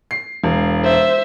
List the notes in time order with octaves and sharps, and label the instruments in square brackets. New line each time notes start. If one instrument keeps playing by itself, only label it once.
[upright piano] C7
E1
[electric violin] C5 E5